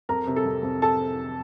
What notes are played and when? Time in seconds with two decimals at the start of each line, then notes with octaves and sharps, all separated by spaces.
0.09 F2 A#4 A#5
0.27 C3
0.36 A4 A5
0.46 F2
0.63 F2
0.82 A4 A5